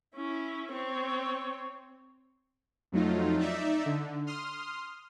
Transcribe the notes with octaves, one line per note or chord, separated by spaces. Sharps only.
C#4 E4
C4 C#5
F2 F#3 A3 D#4 F4
D#4 D5 E5
D3
C6 D#6 F6